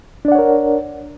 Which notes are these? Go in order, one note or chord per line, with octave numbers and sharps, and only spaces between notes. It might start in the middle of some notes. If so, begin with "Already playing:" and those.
D4 A#4 C#5 D5 F#5